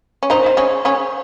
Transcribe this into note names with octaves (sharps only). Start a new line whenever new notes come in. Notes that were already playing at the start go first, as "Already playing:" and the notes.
C#4
D#3 D#4 C5
C4
C#3 C#4
C#3 C#4